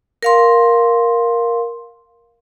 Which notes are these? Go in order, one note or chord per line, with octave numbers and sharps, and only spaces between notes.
A#4 F5 C6